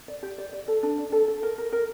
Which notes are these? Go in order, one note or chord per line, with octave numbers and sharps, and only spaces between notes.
D5
G4
D5
D5
A4
D4
D5
A4
A4
A#4
A#4
A#4